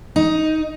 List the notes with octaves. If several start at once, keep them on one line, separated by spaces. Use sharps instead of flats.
D#4